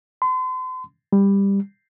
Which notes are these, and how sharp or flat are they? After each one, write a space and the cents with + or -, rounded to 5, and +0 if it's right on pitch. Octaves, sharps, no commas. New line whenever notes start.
C6 -40
G3 +15